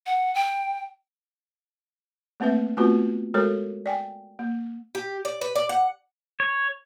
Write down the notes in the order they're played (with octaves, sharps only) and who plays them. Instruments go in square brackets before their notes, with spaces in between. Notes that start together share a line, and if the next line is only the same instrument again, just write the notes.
[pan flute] F#5
G5
[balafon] A3 A#3 C4 B4 E5
A3 B3 C4 F4 F#4 B4
G#3 F#4 A4 A#4 C#5
D5 G5 G#5
A#3
[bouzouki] G4
D5
B4
D5
F#5
[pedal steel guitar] C#5